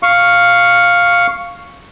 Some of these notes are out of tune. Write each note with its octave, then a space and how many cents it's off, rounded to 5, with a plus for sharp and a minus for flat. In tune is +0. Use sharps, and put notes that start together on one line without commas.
F5 +0 C#6 +0